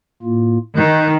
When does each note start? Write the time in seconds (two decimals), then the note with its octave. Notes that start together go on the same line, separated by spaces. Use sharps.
0.22 A2 A#3 F4
0.76 D#3 F#6 G6